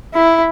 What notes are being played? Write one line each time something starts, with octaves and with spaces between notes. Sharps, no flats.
E4